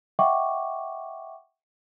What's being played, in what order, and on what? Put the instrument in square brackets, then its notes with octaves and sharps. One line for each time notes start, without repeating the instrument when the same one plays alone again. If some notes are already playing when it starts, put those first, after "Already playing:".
[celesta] D#5 E5 F#5 G5 C#6 D6